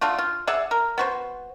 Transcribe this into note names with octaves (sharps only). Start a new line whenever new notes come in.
A3 D4 F4 F#4
F4
G#4 D5 E5 F#5
A#4
B3 F#4 C5